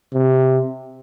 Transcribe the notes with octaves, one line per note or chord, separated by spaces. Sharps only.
C3